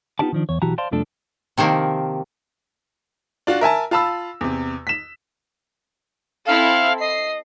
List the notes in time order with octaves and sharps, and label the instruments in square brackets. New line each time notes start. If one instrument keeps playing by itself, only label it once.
[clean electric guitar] B3 D#4 F4 G4 D5 A5
D#3 F3 D4
E2 C#5
B1 E3 F#4 G4 A5 A#5
C5 D5 F5 A5 C6
C2 F2 F3 A3 D4 A4
[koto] C3 D#3 F3 A#3
[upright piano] D4 F4 F#4
A#4 E5 G#5 A5
F4 F5 A5 B5 E6
E2 C3
B6 E7
[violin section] C4 E4 A4 [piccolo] F5
[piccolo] D#5 [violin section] C7